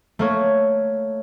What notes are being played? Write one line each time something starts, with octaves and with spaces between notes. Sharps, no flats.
A3 A#3 C#5